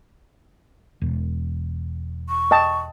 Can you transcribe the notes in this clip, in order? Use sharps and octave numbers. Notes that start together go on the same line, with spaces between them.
E1
C#6
D#5 G5 A5